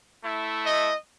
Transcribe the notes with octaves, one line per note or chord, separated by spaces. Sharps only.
A3 E4
D#5